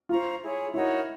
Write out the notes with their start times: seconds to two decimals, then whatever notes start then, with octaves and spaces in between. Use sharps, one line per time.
0.09 F4 C5 F5 A#5 C#6
0.42 E4 G#4 C#5
0.74 D#4 E4 F#4 A#4 C#5